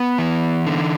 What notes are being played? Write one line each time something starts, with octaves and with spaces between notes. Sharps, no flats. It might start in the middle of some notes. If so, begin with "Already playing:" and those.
Already playing: B3
E3
D3